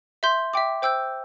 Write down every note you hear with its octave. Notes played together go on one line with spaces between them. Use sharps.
E5 C6 G6
E5 G5 D6
C5 G5 E6 G6